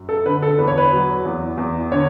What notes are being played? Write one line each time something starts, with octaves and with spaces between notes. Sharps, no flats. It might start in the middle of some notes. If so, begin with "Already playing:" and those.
Already playing: F#2
A4
D3 B4
A4
E2 B4
C#5
B4
F#3
E2
E2
D3 C#5